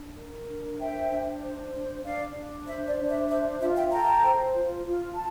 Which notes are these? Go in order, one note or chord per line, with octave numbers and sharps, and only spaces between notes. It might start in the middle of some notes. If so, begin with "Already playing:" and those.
Already playing: D4
A#4
D4
C5 E5 G5
D4
C5
D4
D4 D5 F5
D4
C5 E5
D5
D4
E5
C5 E5
F4 E5
E5 G5
A4 G5 A#5
C5
F4
F4
A5